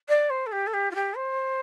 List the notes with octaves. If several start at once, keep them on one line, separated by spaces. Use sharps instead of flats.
D5
C5
A4
G4
A4
G4
F4
G4
C5